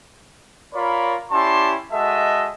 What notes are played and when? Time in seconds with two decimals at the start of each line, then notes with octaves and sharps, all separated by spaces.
0.74 F4 A#4 C#5 D5 B5
1.32 C#4 E4 G4 D5 A5 C6
1.92 G#3 F#4 A4 D#5 E5 A5